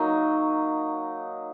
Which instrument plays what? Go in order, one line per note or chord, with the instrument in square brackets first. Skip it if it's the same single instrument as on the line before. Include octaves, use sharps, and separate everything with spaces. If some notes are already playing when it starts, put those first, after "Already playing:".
Already playing: [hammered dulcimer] F#3 A#3 D#4